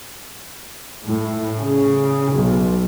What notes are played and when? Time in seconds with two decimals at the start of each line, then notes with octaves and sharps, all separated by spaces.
1.04 A2
1.58 C#3
2.32 B1